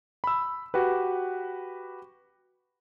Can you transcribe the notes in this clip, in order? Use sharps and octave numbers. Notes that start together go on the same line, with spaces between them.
B5 E6
F#4 G4 B4